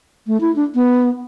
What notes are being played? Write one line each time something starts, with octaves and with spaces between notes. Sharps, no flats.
A3
E4
D4
B3